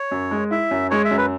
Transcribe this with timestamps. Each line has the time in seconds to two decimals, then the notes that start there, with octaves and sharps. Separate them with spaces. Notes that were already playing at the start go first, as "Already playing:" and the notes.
Already playing: C#5
0.11 F#2
0.31 G#3
0.51 E4 E5
0.71 F#2
0.90 G#3 C#5
1.05 E5
1.11 F#2
1.18 B4